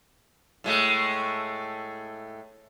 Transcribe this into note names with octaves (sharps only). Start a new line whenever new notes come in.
A2 G#3 A3